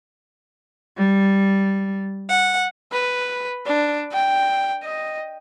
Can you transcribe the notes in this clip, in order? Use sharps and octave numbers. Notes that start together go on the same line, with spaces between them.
G3
F#5
B4
D4
G5
D#5